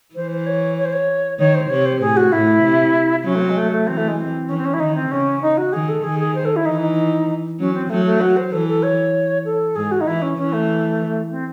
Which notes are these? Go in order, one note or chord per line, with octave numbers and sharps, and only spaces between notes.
E3 C5
C5
C#5
C#5
C5
C#5
D#3 C#5
C5
C3 C#5
C5
A2 G#4
F#4
A2 E4
C3
F#3 C#4
A3
C4
G#3
A3
A3
E3 C4
A3
G#3
C4
E3 C#4
C4
C#4
E4
D#3 D#4
C4
C#3 C#4
D#4
F#4
D#3 G#4
A4
D#3 G#4
G#4
C5
A4
E4
E3 D#4
D#4
F#3 C#4
C4
F#3 A3
A3
F#4
C5
E3 A4
A4
C#5
A4
G#2 G#4
F#4
D#4
E3 E4
C#4
E3 C#4
A3
C4